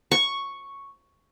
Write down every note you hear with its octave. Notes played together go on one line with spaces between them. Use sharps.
C#6